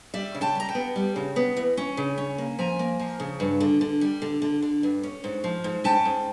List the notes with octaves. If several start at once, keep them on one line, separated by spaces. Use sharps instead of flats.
G3 D5 E5
C#3
G5 A5
G3 A#5
G5 A5
B3
G3
C#3
B3
E3
C#4
C#3
C#4
A#3
F3 G#5 A#5
A#3
F3
C#3
G2
D3
D3
G3
D3
D3
D3
G2
C#4
G#2
F3
G#2
C#4 G5 A5
G#2